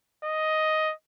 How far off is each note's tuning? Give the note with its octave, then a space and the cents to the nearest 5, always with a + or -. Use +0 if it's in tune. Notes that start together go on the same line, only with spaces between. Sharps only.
D#5 +5